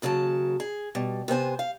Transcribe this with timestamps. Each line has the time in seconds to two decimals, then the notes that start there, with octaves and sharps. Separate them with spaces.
0.02 D#2 C#3 F#3 A4 A5
0.60 G#4
0.95 B2 G3
1.28 C3 B3 C5 G#5
1.59 F5